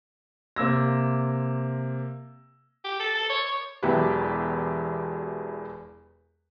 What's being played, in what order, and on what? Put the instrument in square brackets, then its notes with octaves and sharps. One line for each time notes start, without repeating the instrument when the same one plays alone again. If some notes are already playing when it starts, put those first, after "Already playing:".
[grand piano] C3 A#3 E6 A#6
[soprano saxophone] G4
A4
A4
C#5
C#5
[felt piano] E1 E2 F#3 E4 G4 B4